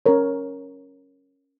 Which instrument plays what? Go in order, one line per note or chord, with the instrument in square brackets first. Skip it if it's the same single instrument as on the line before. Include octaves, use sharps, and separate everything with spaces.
[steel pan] C#4 A#4 C#5